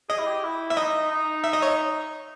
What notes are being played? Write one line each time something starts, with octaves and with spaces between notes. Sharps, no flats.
G#4 D#5
E4
G4
E4
E5
D#4 D#5
D#4
E5
D#5
C#5